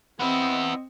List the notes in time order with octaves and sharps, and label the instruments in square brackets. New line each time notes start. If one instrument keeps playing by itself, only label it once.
[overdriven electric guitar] B3 E4 [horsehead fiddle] C4 D#5